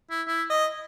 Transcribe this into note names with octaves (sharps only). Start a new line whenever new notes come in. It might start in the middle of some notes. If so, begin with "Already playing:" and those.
E4
E4
D#5